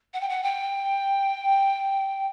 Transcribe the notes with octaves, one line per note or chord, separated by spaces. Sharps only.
F#5
G5
F#5
G5